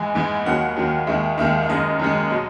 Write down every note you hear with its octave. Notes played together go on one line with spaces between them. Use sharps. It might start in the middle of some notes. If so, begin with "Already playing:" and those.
Already playing: G#2 E3 G#3 G#5
G#2 E3 G#3
D#2 D#3 F#3 F#5
D#2 D#3 F#3
D#2 D#3 G#3 E5
D#2 D#3 G#3 E5
E5
F#2 D#3 G#3 D#5
F#2 D#3 G#3
B2 F#3 D#5